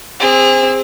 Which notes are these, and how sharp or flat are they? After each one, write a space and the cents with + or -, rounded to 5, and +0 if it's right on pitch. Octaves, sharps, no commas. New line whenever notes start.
C4 +0 G#4 -35